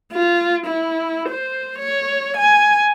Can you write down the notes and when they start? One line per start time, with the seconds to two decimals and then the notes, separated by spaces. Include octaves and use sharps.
0.13 F4
0.66 E4
1.29 C5
1.78 C#5
2.37 G#5